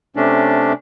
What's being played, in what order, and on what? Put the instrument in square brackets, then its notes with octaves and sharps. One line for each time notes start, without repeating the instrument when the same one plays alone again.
[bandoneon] C3 A3 C#4 D4